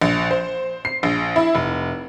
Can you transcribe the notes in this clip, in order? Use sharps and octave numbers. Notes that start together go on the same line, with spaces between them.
A#1
C5
C7
A#1
E4
F1